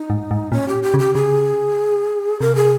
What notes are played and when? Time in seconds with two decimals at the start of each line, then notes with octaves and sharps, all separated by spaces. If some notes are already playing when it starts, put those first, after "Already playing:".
Already playing: D#4
0.10 G#2
0.31 G#2
0.52 A#2 C#4
0.68 G4
0.83 G4
0.94 C#3
0.99 G4
1.14 C#3 G#4
2.41 C3 A#4
2.55 G#4